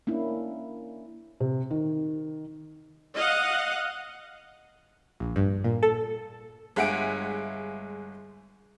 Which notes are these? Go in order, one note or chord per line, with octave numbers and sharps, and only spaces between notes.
A#3 C#4 D4 E4
C3
D#3
D#5 F5 F#5
A#1
G2
A#2
A4
G1 G#3 E5 F#5 G#5 D7